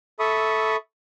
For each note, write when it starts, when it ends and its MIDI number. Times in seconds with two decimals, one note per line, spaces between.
0.19 0.76 69
0.19 0.76 76
0.19 0.76 83
0.19 0.76 85
0.19 0.76 87